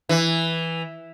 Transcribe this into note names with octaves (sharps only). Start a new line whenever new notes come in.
E3